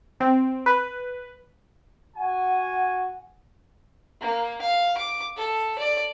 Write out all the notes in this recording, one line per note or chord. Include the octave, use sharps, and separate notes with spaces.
C4
B4
F#4 F#5 G#5
A#3
F5
D6
A4
D5